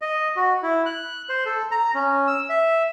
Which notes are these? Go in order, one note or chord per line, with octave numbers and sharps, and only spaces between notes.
D#5
F#4
E4
F#6
C5
A4
A#5
C#4
E6
E5